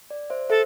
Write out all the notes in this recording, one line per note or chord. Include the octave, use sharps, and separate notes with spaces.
D5
C5 E5
A4 C5 E5